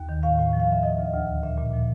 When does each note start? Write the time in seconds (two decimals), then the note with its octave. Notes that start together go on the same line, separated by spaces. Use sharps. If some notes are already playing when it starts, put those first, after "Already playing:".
Already playing: D#2
0.09 D#3
0.23 A2 F5
0.39 A2
0.53 F3
0.60 F5
0.68 F3 E5
0.83 F3 D#5
0.98 D2
1.13 D2
1.29 D3
1.43 A#2 E5
1.58 A#2
1.73 F3